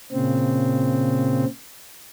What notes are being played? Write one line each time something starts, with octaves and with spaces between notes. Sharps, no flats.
A#2 C#3 C4